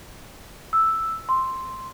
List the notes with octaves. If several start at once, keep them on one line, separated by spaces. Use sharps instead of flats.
E6
C6